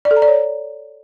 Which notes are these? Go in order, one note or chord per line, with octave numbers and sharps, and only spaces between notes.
D5
A4
A#5
D5
C#5